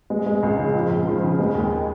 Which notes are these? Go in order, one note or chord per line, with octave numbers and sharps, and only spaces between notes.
G#3
G#3
C#2
C#3
F3
C#2
F3
C#3
G#3
D#2